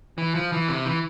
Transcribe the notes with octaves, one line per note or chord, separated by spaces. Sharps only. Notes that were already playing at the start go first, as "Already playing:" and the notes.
E3
F3
E3
C3
E3